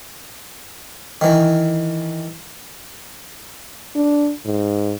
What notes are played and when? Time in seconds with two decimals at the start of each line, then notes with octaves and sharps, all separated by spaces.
1.21 D#3 E3
3.96 D4
4.45 G#2